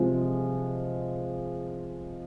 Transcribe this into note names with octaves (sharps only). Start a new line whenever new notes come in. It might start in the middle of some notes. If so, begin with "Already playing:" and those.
Already playing: C3 F3 G#3